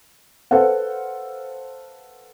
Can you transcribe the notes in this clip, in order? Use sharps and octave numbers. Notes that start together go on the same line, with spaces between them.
A4 B4 C5 F5 F#5